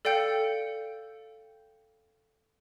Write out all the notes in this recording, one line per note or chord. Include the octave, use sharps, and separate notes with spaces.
A4 D5 F5 G5 G6 C#7